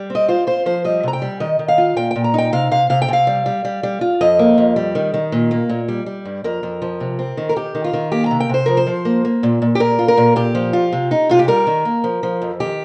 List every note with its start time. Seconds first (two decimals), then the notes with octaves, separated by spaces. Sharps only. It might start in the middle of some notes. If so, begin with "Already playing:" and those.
Already playing: G3
0.10 C4
0.15 D#5
0.28 F4 C5
0.47 F4 C5
0.66 F3 C5
0.84 G3 D#5
1.03 C3 A#5
1.13 G5
1.22 G3
1.40 D#3 D#5
1.59 D#3
1.68 F5
1.78 F4
1.96 A#2 G5
2.11 A#2 G5
2.24 A#5
2.34 D#4 G5
2.53 C3 F5
2.71 C3 F5
2.90 C3 F5
3.02 G5
3.08 C3 F5
3.27 G3
3.46 G3
3.65 G3
3.83 G3
4.01 F4
4.21 F2 D#5
4.39 A#3
4.58 F2
4.76 G3
4.95 D#3
5.14 D#3
5.32 A#2
5.51 A#3
5.69 A#2
5.88 G3
6.06 G3
6.25 G2
6.44 F2 A#4
6.63 F2
6.82 F3
7.00 C3
7.19 C4
7.37 D#3
7.49 A#4
7.56 D#3 G4
7.75 D#3
7.84 F4
7.93 D#3
8.12 A#3 G4
8.26 C3 A#5
8.40 G5
8.49 C3 C5
8.66 F3 A#4
8.77 C5
8.87 F3
9.05 A#3
9.25 A#3
9.43 A#2
9.62 A#2
9.75 G4
9.80 A#2 A#4
9.99 F4
10.08 A#4
10.17 A#2
10.36 A#2 G4
10.55 F3
10.73 F4
10.93 C3
11.11 D#4
11.29 C3 F4
11.39 G4
11.48 G3 A#4
11.67 D#3
11.85 A#3
12.04 F3
12.23 F3
12.42 F2
12.60 D#3 G4